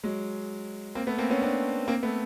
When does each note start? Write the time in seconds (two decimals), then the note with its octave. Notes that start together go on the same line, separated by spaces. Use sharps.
0.03 F#3 G#3
0.95 A#3 C4
1.07 A3 B3
1.18 A#3 C4
1.30 B3 C#4
1.41 C4 D4
1.88 A#3 C4
2.03 A3 B3